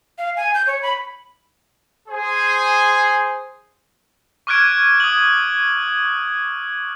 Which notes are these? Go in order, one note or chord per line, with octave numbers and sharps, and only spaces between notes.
F5
G#5
G6
C#5
B5
G#4 C5
C#6 D6 F6 F#6 G#6 D7
D#6 F#7